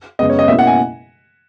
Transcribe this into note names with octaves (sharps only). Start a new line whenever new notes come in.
F#2 C#3 G#3 B3 D#5
C#5
D#5
B2 A#3 C#4 E4 E5
F#5
G#5